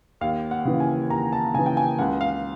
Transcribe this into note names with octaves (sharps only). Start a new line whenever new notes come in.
D#2 F5
F#5
C#3 E3
G#5
D#2 A#5
A5
C#3 E3 G#5
G5
G#5
C#2 F#5
F5